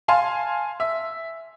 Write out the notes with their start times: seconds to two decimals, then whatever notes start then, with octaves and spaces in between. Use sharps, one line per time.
0.08 F5 G#5 A5 C6
0.80 E5